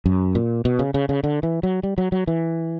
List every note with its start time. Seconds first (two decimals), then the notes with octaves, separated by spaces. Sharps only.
0.06 F#2
0.35 A#2
0.65 B2
0.79 C#3
0.94 C#3
1.09 C#3
1.24 D3
1.43 E3
1.63 F#3
1.83 G3
1.98 F#3
2.12 F#3
2.27 E3